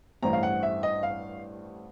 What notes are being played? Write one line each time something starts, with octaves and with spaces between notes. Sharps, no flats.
A1 G2 E3 A3 C4 A#5
F5
F#5
E5
D#5
F5